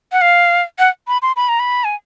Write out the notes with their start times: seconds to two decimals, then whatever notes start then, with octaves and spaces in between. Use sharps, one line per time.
0.12 F#5
0.21 F5
0.79 F#5
1.08 B5
1.22 C6
1.36 B5
1.49 A#5
1.60 B5
1.84 G#5